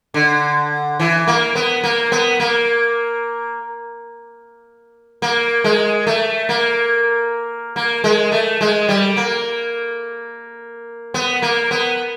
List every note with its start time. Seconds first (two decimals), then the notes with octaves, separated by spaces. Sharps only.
0.14 D3
1.00 E3
1.27 A#3
1.55 B3
1.84 A#3
2.12 B3
2.40 A#3
5.22 A#3
5.64 G#3
6.07 A3
6.49 A#3
7.76 A#3
8.04 G#3
8.32 A3
8.61 G#3
8.89 G3
9.17 A#3
11.14 B3
11.42 A#3
11.71 B3